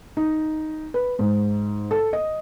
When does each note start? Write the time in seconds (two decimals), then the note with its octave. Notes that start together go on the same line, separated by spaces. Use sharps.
0.17 D#4
0.94 B4
1.19 G#2
1.91 A4
2.13 D#5